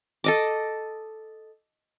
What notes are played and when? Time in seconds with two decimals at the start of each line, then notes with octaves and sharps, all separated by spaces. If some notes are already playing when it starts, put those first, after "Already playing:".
0.24 A4 D#5 D6